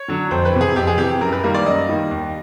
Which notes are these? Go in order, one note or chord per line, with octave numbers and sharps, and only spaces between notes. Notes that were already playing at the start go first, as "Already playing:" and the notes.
Already playing: C#5
D3 F#3
F2 C5
B4
C3 E3
G#4
F2 G4
G#4
C3 E3 G4
F#2 A#4
B4
D#3 G3 A#3 A#4
D5
F#2 D#5
D#3 G3 A#3
D#2